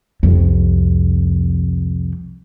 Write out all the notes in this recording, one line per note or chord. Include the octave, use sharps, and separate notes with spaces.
C2 F2